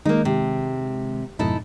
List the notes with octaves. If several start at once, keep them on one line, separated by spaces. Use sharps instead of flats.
D#3 G#3 A#3 D#4
C3
F2 G#2 B2 D#4 E4 A4